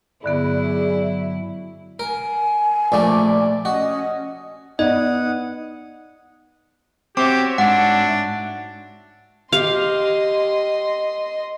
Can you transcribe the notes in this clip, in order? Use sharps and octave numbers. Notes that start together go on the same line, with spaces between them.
G2 D3 F#3 B3 E4 G#4 D5
A#4 G#5
A#1 A#2 A3 D5
C#4 F#4 D#5
B3 D#4 D5 D#5 F#5 D#6
C4 F#4 G4 C#5 E5 D6
G#2 D4 F#5
G4 D#5 F5 C6